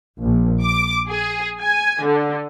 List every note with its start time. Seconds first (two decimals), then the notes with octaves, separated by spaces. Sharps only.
0.20 A#1
0.62 D6
1.08 G#4
1.61 G#5
2.03 D3